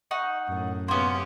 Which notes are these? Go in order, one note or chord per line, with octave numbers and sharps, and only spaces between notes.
D#4 F#5 C#6
F#2 A2
C3 A#3 B3 C#4 G4 C6